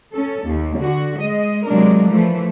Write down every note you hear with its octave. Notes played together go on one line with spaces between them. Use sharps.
C#4 A4
D#2
D3 F#4
G#3 D#5
C3 F#3 G#3 A#3 D4 A#4
E3 F3 A3